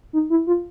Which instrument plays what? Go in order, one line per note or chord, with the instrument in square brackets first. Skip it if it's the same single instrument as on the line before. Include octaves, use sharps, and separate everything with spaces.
[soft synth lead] D#4
E4
F4